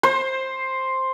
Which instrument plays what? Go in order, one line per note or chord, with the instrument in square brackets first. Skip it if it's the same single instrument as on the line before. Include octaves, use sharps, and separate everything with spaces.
[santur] C5